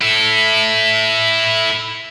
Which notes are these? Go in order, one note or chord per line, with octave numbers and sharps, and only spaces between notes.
E4 A4